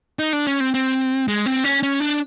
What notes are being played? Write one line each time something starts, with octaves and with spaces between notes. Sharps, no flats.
D#4
D4
C#4
C4
C4
G#3
C4
C#4
C#4
D4